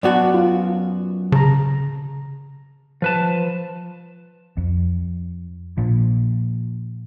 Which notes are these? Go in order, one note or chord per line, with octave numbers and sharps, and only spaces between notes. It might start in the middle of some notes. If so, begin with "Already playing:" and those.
F#2 B3 F#4 D5 F#5 A5
F4
C#3 A5 A#5
F3 B4 A5
F2
A#2 F3